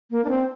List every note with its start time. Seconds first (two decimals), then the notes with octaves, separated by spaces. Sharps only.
0.11 A#3
0.24 D4
0.30 C4